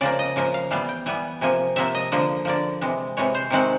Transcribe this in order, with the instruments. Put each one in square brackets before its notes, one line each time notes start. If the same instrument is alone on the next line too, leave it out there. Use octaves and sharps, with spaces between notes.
[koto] C#3 F3 A#3 D5
D#5
C#3 F3 A#3
F5
E3 G3 B3 F5
G5
E3 G3 B3 G#5
C3 F3 A#3 G#5
C3 F3 A#3 E5
D#5
D3 F3 A#3
D3 F3 A#3 D5
C3 E3 G#3
C3 E3 G#3 C#5
C5
C3 D#3 G#3 C4 F#5